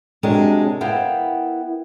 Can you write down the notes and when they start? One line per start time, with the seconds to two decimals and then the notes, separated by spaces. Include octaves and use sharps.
0.23 C3 F#3 G#3 D4 A#4
0.81 B3 E4 A#4 F5 G5